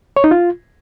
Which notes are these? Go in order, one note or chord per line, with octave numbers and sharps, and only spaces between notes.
C#5
D#4
F4